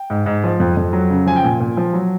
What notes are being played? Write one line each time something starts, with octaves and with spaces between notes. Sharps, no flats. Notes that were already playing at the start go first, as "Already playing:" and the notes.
Already playing: G5
G#2
G#2
F3
F2
F2
F#3
C#3
F3 G#5
G5
A#2 G#5
A#2
F3
F#3